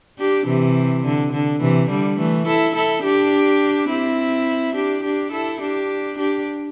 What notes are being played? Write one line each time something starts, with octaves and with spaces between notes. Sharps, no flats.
D4 G4
C3 E3
D3
D3
C3 E3
D3 G3
E3 A3
E4 A4
E4 A4
D4 G4
C4 E4
D4 G4
D4 G4
E4 A4
D4 G4
D4 G4